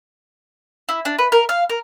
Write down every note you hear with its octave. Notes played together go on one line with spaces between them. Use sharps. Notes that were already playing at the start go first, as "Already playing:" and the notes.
E4
D4
B4
A#4
F5
A#4